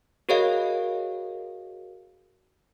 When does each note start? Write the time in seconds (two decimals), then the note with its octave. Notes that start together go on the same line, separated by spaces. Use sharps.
0.29 F#4 G#4 A#4 C#5 D#5 F5